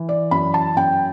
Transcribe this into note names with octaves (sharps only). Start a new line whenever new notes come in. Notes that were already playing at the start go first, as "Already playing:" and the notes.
Already playing: E3
D5
F#2 B5
A5
F#2 G5